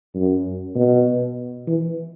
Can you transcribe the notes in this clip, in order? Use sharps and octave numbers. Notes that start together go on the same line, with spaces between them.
F#2
B2
E3